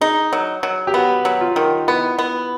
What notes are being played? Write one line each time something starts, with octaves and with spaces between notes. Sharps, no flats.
D#4 G#4
F#3
F#3
G4
B3 F#4
F#3
F4
D#3
B3 E4
B3